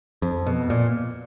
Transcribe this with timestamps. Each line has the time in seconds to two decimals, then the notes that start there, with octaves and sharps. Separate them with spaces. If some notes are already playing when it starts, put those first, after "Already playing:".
0.22 F2
0.47 B2
0.70 A#2